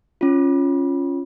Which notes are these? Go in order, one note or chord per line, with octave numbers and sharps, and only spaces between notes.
C#4 F4